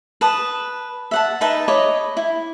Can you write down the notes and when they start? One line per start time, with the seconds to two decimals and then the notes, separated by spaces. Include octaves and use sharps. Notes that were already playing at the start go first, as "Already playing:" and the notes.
0.21 B4 A5 D#6
1.11 E5 F#5 A5
1.41 D#4 B4 E5 A5
1.68 C#5 D#5 B5 D6
2.17 E4